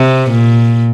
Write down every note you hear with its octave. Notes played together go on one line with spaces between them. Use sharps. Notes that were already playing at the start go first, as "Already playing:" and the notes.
Already playing: C3
A#2